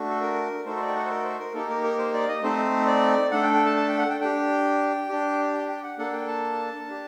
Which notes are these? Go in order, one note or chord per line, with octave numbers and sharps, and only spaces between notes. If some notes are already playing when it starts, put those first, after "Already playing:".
Already playing: A3 D4 F#4
A4
A#4
A3 D#4 F#4 A4 C5
C5
D5
G5
F#5
C5
A#4
C5
A#4
A#3 D#4 G4 A4
A#4
A#4
C5
D5
D#5
A3 C4 D#4 C5
D5
A3 D4 A4 F#5
G5
G5
A5
A5
G5
F#5
G5
D4 G4 G5
D4 G4
G5
G5
F#5
A#3 D4 A4 F#5
G5
A5
D4 G4